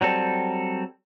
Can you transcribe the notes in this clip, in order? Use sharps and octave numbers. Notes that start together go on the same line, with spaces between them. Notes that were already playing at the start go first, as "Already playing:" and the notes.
F#3 G3 C4 A4